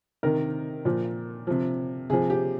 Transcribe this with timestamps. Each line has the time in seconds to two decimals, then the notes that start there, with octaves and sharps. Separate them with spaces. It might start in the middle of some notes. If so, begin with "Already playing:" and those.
0.23 C3 D#3 A#4
0.85 A#2 F3
1.47 C3 F3
2.10 C3 F3 G#4
2.30 G4